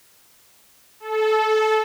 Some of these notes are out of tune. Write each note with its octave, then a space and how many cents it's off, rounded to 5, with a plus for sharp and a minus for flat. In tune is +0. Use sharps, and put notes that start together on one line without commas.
A4 -20